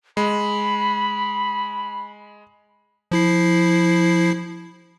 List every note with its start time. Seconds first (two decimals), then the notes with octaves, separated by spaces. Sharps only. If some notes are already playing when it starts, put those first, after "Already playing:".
0.17 G#3 B5
3.11 F3 E4 C7